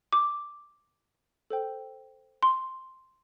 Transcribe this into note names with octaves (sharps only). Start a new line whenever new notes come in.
D6
A4 C5 G5
C6